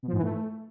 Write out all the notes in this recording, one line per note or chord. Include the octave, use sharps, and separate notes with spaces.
B2
F3
G#2
E3
A3